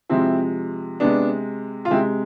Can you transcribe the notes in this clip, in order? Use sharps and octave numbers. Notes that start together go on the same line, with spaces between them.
C3 F3 G#3 C4 E4
C3 G#3 B3 D4
F4
C3 G#3 C4 E4